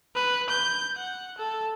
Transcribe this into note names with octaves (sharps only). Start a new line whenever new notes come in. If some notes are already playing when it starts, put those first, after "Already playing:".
B4
G6
F#5
A4